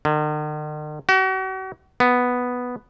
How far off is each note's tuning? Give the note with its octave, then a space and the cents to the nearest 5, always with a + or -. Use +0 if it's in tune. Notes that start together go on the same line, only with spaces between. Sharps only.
D#3 -45
F#4 +40
B3 +0